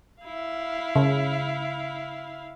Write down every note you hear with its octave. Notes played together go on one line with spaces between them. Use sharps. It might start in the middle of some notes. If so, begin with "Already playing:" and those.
E4 F5
C#3